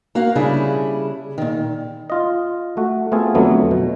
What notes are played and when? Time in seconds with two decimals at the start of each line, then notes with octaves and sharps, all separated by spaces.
0.15 A#3 F#4 A#4 F5
0.36 C#3 G3 D4 E4 G#4
1.38 A#2 D#3
2.10 F4 D#5
2.77 A3 F#4
3.12 A3 B3 C4 F4 G#4 A4
3.35 F2 D3 F#3 A3 B3
3.71 B2